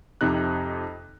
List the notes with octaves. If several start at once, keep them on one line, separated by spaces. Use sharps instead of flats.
F2 C3 D#4 F#6